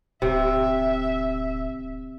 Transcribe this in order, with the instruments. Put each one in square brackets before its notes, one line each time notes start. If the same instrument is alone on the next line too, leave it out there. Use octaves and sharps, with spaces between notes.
[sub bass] D1 [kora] C3 [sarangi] E5